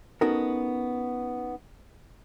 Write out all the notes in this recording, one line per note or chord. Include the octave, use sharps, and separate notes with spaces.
B3 C#4 D#4 F#4 A4 A#4